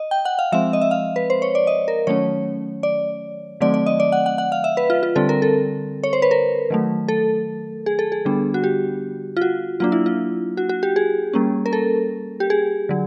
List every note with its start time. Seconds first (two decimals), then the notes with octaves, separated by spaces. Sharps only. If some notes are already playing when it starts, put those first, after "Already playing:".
Already playing: D#5
0.11 G5
0.25 F#5
0.39 F5
0.52 F3 G#3 C4 E5
0.73 D#5
0.81 E5
0.91 F5
1.16 B4
1.30 C5
1.42 C#5
1.55 D5
1.67 D#5
1.88 A#4
2.07 D#3 F#3 A3 C#4 C#5
2.83 D5
3.61 D#3 F#3 A3 C4 D5
3.74 D5
3.86 D#5
4.00 D5
4.12 F#5
4.26 F#5
4.38 F#5
4.52 F5
4.64 E5
4.77 B4
4.90 F4
5.03 F4
5.16 D3 G3 C4 A4
5.29 A#4
5.42 A4
6.03 C#5
6.13 C5
6.22 B4
6.31 A#4
6.70 D#3 F#3 A3
7.08 A4
7.86 G#4
7.99 A4
8.12 G#4
8.25 D3 G3 B3 D4
8.54 F#4
8.64 G4
9.37 F4
9.41 F#4
9.80 F#3 A#3 D4 F4
9.92 E4
10.06 F4
10.57 F#4
10.69 F#4
10.83 G4
10.96 G#4
11.34 G3 A#3 C#4
11.66 A#4
11.73 A4
12.40 G4
12.50 G#4
12.89 D3 F#3